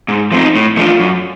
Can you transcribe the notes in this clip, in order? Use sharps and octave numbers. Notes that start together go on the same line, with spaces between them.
G#2
F3 A3 C4 D#4
A2
F3 A3 D4 F4
F#2